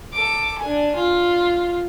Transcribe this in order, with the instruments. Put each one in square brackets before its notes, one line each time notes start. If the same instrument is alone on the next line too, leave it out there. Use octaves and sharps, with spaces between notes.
[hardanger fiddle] A4 D6
D4 G#5
F4